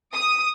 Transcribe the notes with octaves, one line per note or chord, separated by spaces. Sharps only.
D#6